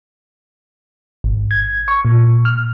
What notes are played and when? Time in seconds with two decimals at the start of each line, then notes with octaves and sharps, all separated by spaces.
1.24 G#1
1.51 G#6
1.88 C#6
2.05 A#2
2.45 F6